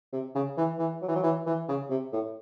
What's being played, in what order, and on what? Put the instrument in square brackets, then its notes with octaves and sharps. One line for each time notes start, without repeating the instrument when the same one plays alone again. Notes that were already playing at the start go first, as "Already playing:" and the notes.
[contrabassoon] C3
C#3
E3
E3
F#3
E3
F#3
E3
E3
C#3
C3
A2